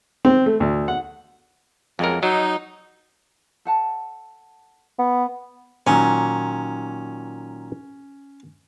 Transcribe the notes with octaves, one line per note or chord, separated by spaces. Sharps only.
C4
A3
D2
F#5
F2 C#3 F#3 G#3 A#4
F#3 D#4
A4 F#5 A5
B3
A#2 D#3 F#3 C#4